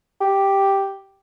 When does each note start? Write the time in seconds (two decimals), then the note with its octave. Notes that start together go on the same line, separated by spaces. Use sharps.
0.21 G4